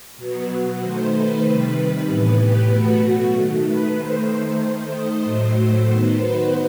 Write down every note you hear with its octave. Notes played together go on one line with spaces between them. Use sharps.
B2 F#3 B3
D#3 A3 C5
B4
C3 D#3 G3 B4
A2 E3 B3
G4
B2 F#3 A3 F#4
D#3 A3
B4
D#3 A3 C5
D#3 A3
D#5
A2 F#3 A3 C5
D#3 F#3 B3
B4